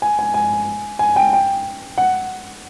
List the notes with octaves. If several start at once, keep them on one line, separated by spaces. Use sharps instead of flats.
G#5
G#5
G#5
G#5
G5
G5
F#5